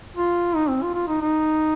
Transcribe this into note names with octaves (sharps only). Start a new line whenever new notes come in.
F4
D#4
C4
F4
F4
D#4
D#4